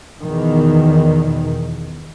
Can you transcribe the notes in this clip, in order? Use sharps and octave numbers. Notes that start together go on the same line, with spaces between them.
E2 B2 D#3